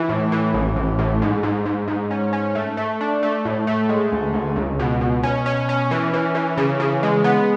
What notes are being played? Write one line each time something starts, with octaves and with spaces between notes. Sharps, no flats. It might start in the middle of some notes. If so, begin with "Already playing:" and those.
Already playing: E3
A2
E3
A1
A1
A2
G#2
G#2
G#2
G#2
C#4
C#4
A3
A3
D4
A3
A2
A3
G#3
D2
D2
C#2
B2
B2
C#4
C#4
C#4
E3
E3
E3
C#3
C#3
G#3
B3